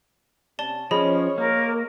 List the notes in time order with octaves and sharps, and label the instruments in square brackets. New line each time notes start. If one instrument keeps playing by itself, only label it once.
[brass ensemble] C3 C#4 [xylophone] D5 A5 G7
[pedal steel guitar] F3 C#4 [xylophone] G#4 D#5 B5 [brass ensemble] C#5
[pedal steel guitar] A#3 [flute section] A#4